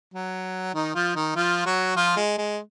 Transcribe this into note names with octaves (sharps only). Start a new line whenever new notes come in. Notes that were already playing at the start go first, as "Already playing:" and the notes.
F#3
D#3 D#4
F3 F4
D#3 D#4
F3 F4
F#3 F#4
F3 F4
G#3
G#3